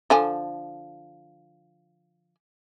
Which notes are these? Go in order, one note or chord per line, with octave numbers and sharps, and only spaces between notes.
D3 F3 G#5